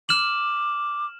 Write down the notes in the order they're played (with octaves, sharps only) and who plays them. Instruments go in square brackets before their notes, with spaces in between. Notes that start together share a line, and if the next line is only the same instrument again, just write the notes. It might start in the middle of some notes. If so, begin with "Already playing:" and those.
[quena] D6 [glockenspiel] F6 E7 F#7